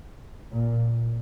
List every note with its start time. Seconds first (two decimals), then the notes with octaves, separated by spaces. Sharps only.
0.51 A#2